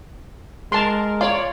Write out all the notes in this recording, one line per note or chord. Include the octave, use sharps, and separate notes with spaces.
G#3 A#4 A5 C6
F4 C#5 D5